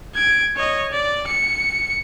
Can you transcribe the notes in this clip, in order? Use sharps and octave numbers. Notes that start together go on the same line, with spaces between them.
G#6 D7
C#5 D#5
D5
C#7